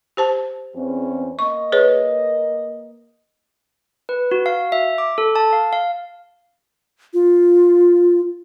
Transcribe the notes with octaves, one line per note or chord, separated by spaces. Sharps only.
G4 C5 A5
E2 C4 C#4
A#3 D#5 C#6
G#4 B4 C#5
B4
F#4
F5
E5
D6
A4
A5
F5
F5
F4